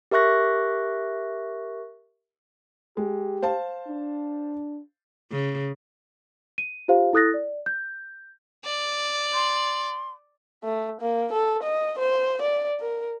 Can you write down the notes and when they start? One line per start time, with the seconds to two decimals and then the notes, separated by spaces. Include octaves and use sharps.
0.11 G4 A#4 E5 C#6 F#6 A#6
2.97 G#3 G4
3.42 C5 F5 A5
3.88 D4
5.32 C#3
6.58 D#7
6.88 F4 G4 C5 F5
7.13 E4 A4 D#6 F#6 A6 A#6
7.34 D5
7.66 G6
8.65 D5
9.33 C6
10.64 A3
11.01 A#3
11.33 A4
11.63 D#5
11.99 C5
12.42 D5
12.80 A#4